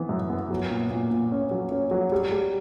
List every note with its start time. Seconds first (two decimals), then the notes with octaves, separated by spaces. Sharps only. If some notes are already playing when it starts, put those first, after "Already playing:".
Already playing: E3 B3
0.09 F#2
0.30 B3
0.51 F#3
0.70 A#2
0.90 A#2
1.11 A#2
1.32 C#4
1.51 F#3
1.71 C#4
1.91 F#3
2.12 G3
2.31 G3